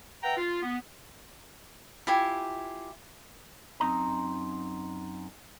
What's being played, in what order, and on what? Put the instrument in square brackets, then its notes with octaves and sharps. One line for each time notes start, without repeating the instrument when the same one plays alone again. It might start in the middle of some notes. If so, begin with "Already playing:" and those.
[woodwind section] B4 E5 F#5 G5 A#5
F4
B3
[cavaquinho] E4 F4 G4 G#5
[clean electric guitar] F#2 C4 D#4 D#5 A#5